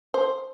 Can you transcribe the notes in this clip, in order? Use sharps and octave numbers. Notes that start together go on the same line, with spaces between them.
C5